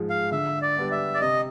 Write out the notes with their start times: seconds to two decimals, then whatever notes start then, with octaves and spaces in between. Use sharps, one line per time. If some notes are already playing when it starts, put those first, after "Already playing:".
Already playing: G#2 F3 G#3
0.10 F5
0.31 D3 E5
0.62 D5
0.77 G3 B3 D4
0.92 E5
1.14 D5
1.21 C3 D#5